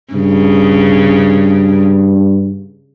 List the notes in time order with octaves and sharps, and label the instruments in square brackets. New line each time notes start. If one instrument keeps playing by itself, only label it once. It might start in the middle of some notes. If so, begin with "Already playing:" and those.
[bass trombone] G2 [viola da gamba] C#3